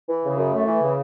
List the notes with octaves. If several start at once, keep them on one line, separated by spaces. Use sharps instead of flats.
E3
C#3
F#2
A3
E3
C#3